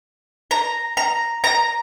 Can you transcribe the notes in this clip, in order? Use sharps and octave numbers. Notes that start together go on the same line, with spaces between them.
A#5
A#5
A#5